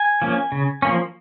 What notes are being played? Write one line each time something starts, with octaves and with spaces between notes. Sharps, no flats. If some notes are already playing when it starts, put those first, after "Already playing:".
Already playing: G#5
F3 A#3 C#4
C#3
F3 A#3 C#4